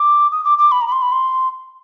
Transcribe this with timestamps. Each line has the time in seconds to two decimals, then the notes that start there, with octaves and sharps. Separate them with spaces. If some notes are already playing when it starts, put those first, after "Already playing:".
Already playing: D6
0.32 D#6
0.45 D6
0.58 D6
0.72 B5
0.81 A#5
0.87 B5
0.92 C6
1.02 B5
1.12 C6